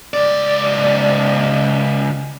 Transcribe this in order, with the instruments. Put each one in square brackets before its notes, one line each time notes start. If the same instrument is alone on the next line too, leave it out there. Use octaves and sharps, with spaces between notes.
[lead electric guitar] C#2 D5